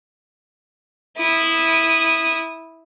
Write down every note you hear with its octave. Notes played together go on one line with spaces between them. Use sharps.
E4 D#6